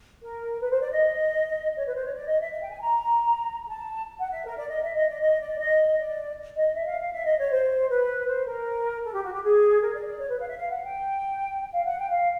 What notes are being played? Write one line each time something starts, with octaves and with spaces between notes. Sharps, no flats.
A#4
B4
C5
D5
D#5
C#5
B4
C5
C#5
D5
D#5
E5
E5
G5
G#5
A#5
A5
F#5
E5
A#4
D5
D#5
E5
D#5
D5
D#5
D5
D#5
D5
D#5
E5
F5
F5
E5
D#5
C#5
C5
B4
C5
A#4
A4
G4
F#4
G4
G#4
A#4
D5
D5
C#5
B4
F5
E5
F5
F#5
G5
F5
F#5
G5
F5